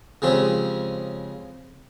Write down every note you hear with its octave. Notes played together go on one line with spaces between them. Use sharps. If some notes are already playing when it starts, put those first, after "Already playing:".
C#3 F3 G#3 C4 G4